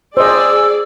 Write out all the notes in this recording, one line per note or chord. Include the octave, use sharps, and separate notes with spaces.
G#4 C5 D5 D#5 E6